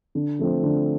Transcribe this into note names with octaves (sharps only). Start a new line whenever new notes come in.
D3
F3 A3 C4
D3